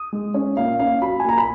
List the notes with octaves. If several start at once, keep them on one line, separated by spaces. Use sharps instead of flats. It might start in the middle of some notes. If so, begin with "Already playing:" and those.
Already playing: D#6
G#3
C#4
A#2 F5
C#4 F5
F#3 B5
G#5
A#2 A#5
B5